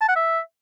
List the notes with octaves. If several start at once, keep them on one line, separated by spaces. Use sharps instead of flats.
A5
F#5
E5